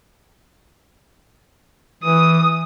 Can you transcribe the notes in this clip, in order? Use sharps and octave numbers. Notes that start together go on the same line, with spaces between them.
E3 D#6